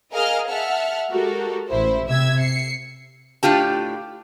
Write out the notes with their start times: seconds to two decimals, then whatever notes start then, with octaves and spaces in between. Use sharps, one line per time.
0.13 G#4 A#4 D#5 F5 F6
0.50 E5 F#5 A5 F6
1.10 G#3 F#4 G4 A4 A#4
1.69 A1 E4 C5
2.07 C3 E5 E6 G#6
2.41 C7 C#7
3.43 A2 D4 F4 G4 A5